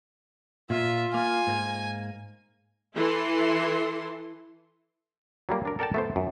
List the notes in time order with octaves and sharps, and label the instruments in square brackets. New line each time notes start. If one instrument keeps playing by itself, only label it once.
[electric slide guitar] A#2 [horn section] F4 [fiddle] E5
[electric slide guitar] A#3 [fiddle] G#5
[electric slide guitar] G#2 A#3
[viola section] E3 E4 A4 C6
[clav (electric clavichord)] F#3 G3 A#3
D4 A#4
A4 A#4 D5 F#5 G5 A5
A3 B3 C5
F#2